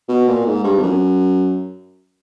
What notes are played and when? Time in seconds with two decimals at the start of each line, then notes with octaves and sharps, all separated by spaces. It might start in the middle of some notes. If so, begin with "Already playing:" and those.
0.09 B2
0.28 A#2
0.46 G#2
0.64 G2
0.79 F2
0.83 F#2